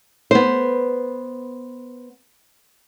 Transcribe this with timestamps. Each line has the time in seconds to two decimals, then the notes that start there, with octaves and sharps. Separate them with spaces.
0.31 B3 C5